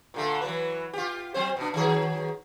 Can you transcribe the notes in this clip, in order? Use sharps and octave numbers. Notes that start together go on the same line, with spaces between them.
A#2 D3 A3
E3 F#3 B4
F4 G4
F#3 C4 C5
B2 D4
D#3 F#3 G#4